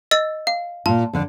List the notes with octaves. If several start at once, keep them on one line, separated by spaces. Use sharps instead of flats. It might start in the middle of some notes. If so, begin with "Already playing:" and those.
D#5 E6 A6
F5
A#2 F4 A5
F2 D3 D4